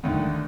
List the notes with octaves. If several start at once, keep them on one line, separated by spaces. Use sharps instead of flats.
D#2 D3 A3 D#4